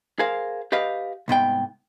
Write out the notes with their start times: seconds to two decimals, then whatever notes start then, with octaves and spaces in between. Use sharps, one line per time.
0.19 G#4 A#4 C5 F5
0.72 G4 B4 D#5 F5
1.28 C2 G#2 B3 G5